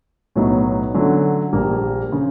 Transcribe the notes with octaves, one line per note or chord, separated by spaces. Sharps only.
B1 A2 F#3 B3 D#4
D3 F#3 A3 C#4
A#1 A#2 G3 A#3
C#3